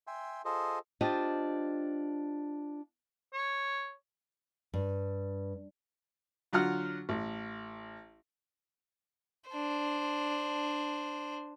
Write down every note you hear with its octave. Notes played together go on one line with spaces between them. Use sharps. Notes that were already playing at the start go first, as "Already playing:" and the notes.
E5 G5 G#5 C6
F4 G#4 A4 C5 D#5
D4 F4 G4 C5 D#5
C#5
G2
D3 F#3 F4 F#5 F6
A1
D4 C5